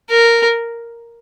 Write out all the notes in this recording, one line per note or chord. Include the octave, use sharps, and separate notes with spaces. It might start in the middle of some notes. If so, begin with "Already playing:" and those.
A#4